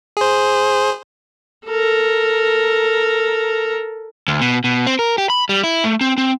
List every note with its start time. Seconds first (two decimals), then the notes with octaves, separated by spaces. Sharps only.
0.17 G#4 C5
1.67 A4 A#4
4.28 D2
4.41 B2
4.64 B2
4.87 C4
4.99 A#4
5.18 G4
5.30 B5
5.49 G3
5.64 E4
5.84 A3
6.01 C4
6.18 C4